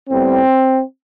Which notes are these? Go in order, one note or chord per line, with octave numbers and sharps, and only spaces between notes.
A2 G3 B3 C4